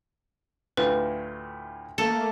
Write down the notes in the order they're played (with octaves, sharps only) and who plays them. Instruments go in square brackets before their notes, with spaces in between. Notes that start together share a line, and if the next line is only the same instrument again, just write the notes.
[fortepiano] D2 A2 F4 [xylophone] B4
[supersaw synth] A3 A#3 [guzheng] A4